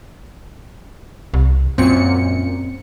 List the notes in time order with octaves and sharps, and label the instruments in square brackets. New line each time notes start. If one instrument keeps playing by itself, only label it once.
[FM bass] C2
[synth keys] F#2 A#2 C#7 [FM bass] C4